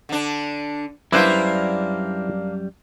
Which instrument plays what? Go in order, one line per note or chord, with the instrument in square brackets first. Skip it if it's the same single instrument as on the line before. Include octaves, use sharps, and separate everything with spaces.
[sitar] D3 D4
[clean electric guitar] F#2 G3 [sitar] A#3 D4 D5 [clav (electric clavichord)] E4 B4 C5